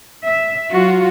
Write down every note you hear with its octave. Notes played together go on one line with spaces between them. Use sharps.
E5
F#3 F4 F#4